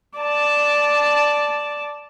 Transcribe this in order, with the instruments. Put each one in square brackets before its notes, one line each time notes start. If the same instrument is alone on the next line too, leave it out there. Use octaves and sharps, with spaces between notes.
[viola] D5 A5